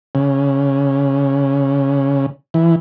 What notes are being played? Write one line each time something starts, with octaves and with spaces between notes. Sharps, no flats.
C#3
E3